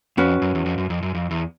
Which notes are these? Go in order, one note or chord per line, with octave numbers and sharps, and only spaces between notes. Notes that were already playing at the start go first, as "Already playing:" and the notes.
F2 C#4 F#4 B4
F#2
E2
F2
F#2
F2
F#2
F2
E2